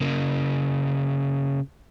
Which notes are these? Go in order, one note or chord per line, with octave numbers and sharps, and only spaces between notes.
C#3 A#3